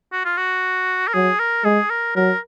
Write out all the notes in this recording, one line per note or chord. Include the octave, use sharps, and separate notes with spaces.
F#4
F4
F#4
A#4
F#3 G#4
A#4
G#3 G#4
A#4
F#3 A#4